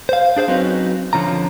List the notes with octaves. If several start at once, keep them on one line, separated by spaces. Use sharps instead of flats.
C5 F5
D4 G#4 C5 F5
F#3 C4 C#4 D#4 F#4 B4
D3 F3 C#4 F4 A#5